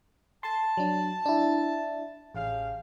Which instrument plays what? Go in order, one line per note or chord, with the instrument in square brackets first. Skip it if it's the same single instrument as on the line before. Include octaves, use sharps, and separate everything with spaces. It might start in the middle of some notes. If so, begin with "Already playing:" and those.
[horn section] A5 [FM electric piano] C6
[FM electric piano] F#3 D4
D4 E4
[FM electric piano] A1 [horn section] C#3 G4 F5